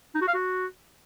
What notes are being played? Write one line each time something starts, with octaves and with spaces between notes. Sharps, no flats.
D#4
F#4
F5
F#4